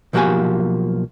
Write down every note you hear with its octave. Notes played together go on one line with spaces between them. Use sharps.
B1 F3 A#3 F#4 G4 G#5